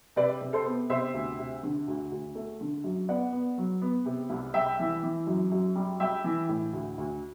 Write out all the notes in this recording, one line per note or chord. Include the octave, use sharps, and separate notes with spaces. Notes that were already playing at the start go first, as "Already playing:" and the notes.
C3 B4 D5
C3
A4 C5
B3
C3 C5 E5
D2
C3
D3
D2
D2
A3
D3
F#2
B3 D5 F#5
B3
F#3
B3
C3
C2
G3 E5 G5
E3
E3
F#2
F#2
G3
G3 E5 G5
E3
A2
D2
D2